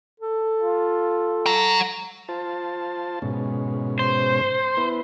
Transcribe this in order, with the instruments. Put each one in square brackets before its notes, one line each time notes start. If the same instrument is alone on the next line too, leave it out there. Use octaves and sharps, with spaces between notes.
[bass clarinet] A4
[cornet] F4
[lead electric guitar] F#5 A#5
[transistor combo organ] F4 C5 A5
G#2 B2 C#4
[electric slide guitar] C5
[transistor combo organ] B3 E4 B4